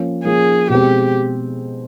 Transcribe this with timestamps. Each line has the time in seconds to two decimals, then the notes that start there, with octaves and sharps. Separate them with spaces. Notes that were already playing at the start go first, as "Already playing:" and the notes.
Already playing: F3 A#3 C#4
0.24 F3 A#3 C#4 G#4
0.70 B2 G#3 C4 G4